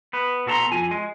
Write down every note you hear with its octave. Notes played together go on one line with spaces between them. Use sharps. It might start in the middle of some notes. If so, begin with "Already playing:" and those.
B3 B4
B2 F#4 A4 D5 A#5 C6
F2 F4 G#5
G#3